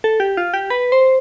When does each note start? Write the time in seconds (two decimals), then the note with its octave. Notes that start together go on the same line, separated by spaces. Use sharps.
0.04 A4
0.20 G4
0.37 F4
0.54 G4
0.70 B4
0.92 C5